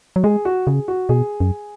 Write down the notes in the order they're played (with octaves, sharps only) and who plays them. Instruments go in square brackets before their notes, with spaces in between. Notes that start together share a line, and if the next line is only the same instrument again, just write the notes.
[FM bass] F#3
[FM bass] G#3 [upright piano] G#4
[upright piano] F#4
[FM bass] C#3 [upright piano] G#4
[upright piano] F#4
[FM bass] B2 [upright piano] G#4
[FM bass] F#2